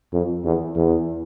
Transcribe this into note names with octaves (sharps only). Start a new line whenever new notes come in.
F2
E2
E2